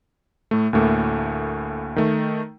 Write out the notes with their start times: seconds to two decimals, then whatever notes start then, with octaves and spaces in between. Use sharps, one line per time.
0.51 A2 A3
0.73 D2 A2 A3 A#3
1.96 D#3 A3